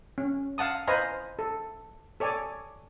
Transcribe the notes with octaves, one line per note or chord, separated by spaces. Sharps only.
C#4
F5 F#5 A5 D#6
B4 C5 D#5 F5 G#5 A#5
A4
A4 C#5 D5 G#5